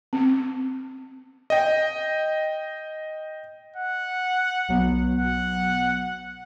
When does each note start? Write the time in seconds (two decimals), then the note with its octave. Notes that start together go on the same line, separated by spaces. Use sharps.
0.13 C4
1.50 D#5 G5
3.76 F#5
4.68 B1 F#3 B3
5.15 F#5